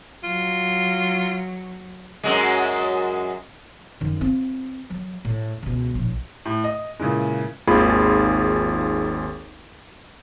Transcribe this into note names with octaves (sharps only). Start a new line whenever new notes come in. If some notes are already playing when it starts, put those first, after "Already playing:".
F#3 F4
F#2 F#3 G#3
F#2 D#3
C4 F4
F#3
A2
C#2 B2
A#1 A2
A2
D#5
A#2 C#3 E3 G#3
G#1 D#2 F4 G#4 B5